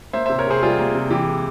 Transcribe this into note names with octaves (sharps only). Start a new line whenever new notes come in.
A#3 C5 E5
C3 C5 E5
A#4 C#5
C3 G#4 C5
G3 F4 G#4
A#3
C3
E3 G4
G#3